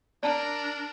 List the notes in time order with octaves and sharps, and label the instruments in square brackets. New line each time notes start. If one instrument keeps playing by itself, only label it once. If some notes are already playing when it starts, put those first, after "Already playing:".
[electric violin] D4 A#4 [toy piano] D5 A5 A#5